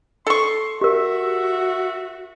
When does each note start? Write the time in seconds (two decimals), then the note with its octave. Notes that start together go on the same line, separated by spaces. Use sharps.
0.27 A4 C6 C#6
0.81 F#4 G4 A#4 E5